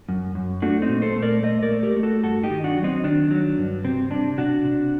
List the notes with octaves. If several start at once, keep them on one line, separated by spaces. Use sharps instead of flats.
F#2
F#2
A3 D4 F#4
C4 D#4
A#2
A4 C5
A3
A#4 D5
A3 C5 D#5
A#4 D5
A3
G4 A#4
A3
F#4 A4
G2 F#4 A4
D#4 G4
D#3
D4 F#4
F#3
C4 D#4
D#3 D4
F#3
G2
C3 C4
C3 D4
C3 D4 F#4
C3